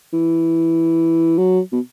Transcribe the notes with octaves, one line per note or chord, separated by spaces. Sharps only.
E3
F#3
B2